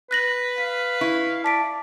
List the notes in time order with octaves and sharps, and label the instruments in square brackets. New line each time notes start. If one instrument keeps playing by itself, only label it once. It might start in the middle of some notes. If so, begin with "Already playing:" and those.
[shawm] B4 [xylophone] F#6 A#6 F#7
[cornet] F5 [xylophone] B6
[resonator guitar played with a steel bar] E4 [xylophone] C#6
[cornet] D5 [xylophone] A5 B6 D7